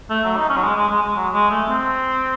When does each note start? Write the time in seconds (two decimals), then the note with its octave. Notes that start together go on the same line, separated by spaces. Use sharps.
0.10 A3
0.24 F#3
0.37 D#4
0.50 C#4
0.57 F#3
0.63 G#3
0.76 G#3
0.89 G#3
1.03 G#3
1.16 F#3
1.34 G#3
1.50 A3
1.69 C4